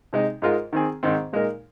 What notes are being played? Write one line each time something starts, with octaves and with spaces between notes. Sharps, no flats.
C3 G#3 D#4
G#2 G#3 F4 A#4
D#3 C4 G#4
G#2 D#3 C4
A#2 G#3 D#4 A#4